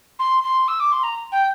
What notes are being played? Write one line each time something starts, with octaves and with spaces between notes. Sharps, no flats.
C6
C6
E6
D6
C6
A#5
G5